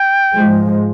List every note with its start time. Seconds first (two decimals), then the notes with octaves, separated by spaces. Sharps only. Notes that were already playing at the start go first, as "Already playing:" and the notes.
Already playing: G5
0.34 G#2 F3 G#3